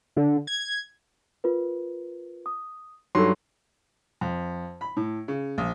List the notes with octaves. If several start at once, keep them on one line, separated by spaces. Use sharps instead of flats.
D3
G#6
F4 A#4 B4
D#6
G2 F#3 D#4 A4 C6
F2
B5
A2
C#3
A#1